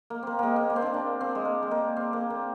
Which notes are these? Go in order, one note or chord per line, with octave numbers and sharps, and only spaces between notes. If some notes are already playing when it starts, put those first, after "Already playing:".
A#3
A#3 C4
G#3 A#3
A#3
A#3
C4
D4
D4
C4
G#3
A#3
G#3
A#3
C4
A#3
A#3